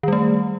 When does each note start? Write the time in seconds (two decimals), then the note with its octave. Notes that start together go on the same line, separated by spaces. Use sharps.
0.03 D#3
0.08 G3
0.13 A3